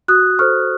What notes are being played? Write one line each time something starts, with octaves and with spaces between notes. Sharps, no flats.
F#4 D#6 F#6
A4 C5 C#6 F6